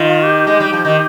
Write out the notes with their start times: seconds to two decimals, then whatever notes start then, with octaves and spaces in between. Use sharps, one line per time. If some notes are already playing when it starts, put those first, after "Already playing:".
Already playing: D#3 F4
0.22 G4
0.47 G#3
0.60 G3
0.73 F3
0.85 D#3